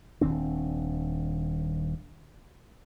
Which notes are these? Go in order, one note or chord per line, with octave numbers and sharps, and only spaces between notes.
D#1 D#3 C4 D4